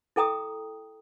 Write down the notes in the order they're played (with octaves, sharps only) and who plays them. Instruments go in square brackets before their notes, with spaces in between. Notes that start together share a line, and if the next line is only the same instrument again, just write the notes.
[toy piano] E4 A4 G5 A#5 D#6